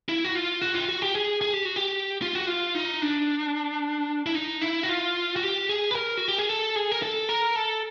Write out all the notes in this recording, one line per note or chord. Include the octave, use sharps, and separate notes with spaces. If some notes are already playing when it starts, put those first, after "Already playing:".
E4
F#4
F4
F#4
F4
F#4
G4
G#4
G#4
G4
F#4
G4
F4
F#4
F4
D#4
D4
E4
D#4
E4
F#4
F4
F#4
G4
G#4
B4
A#4
F#4
G4
G#4
A4
G#4
A#4
A4
A#4
A4